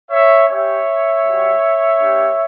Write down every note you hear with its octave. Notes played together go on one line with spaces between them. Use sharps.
C#5 E5
C#4 G4 C#5 E5
G3 C#4 F#4
A#3 D4 G4